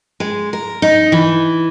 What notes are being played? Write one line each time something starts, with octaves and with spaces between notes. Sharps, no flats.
G#3
A#4
D#4
E3